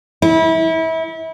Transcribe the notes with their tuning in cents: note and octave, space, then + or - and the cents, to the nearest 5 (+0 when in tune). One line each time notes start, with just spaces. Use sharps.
E4 -30